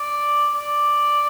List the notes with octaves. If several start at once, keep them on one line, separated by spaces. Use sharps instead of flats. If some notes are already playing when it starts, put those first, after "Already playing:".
Already playing: D5
D5